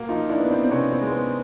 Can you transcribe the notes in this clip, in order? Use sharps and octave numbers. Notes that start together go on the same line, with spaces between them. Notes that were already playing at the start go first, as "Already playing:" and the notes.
Already playing: B2 A#3
F3 D#4 F4
D4 E4
B3
C4 D4
C4
C3 B3 C#4
C4
G#3
B3